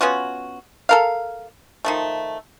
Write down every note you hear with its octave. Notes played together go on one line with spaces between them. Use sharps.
B3 C#4 F4 F#4
A4 A#4 F5
D#3 F3 A3